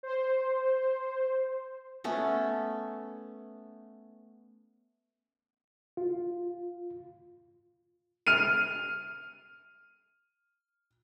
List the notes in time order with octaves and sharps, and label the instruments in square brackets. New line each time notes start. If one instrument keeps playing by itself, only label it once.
[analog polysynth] C5
[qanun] A3 B3 C#4 A4
[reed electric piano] F4
[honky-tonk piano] F6 D#7